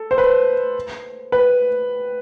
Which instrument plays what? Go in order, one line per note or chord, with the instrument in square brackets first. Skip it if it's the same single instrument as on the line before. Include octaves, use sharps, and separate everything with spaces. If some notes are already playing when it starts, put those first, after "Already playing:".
Already playing: [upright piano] A4
C5
B4
B4